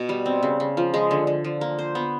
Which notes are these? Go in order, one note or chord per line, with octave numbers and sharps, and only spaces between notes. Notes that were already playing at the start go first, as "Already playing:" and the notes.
Already playing: B2
G3
C4
C#3
C#3
F3
G#3
D3
D3
F3
A#3
C5
B3